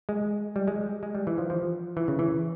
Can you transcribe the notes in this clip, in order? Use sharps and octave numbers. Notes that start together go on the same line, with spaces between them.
G#3
G3
G#3
G#3
G3
E3
F3
F3
E3
C#3
E3